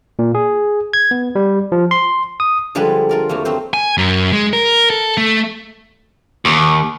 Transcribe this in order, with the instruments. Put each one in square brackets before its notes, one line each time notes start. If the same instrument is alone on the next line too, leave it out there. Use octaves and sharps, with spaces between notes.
[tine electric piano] A#2
G#4
G#6
B3
G3
F3
C6
D#6
[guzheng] D3 F3 G3 G#3 G#4 B4
F4 A#4 D5
F2 F#3 A3 A#3
F#3 B3 C4 C5
[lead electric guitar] G#5
F#2
G#3
A#4
A4
A3
[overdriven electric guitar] D#2